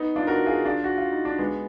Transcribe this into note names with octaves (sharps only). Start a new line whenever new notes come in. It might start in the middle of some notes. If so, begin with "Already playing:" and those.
Already playing: B3 D#4
D4 F4
F#4 A#4
F4 G#4
D4 F4
F#4
F4
D#4
D4
G#3 B3